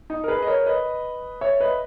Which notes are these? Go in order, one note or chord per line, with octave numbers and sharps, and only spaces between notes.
D#4
A#4
G#4 B4
D#5
A#4 C#5
B4 D#5
C#5 E5
B4 D#5